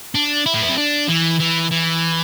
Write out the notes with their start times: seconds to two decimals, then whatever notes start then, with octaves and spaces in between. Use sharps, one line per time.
0.15 D4
0.46 E4
0.54 A3
0.62 B3
0.70 C4
0.78 D4
1.09 E3
1.40 E3
1.71 E3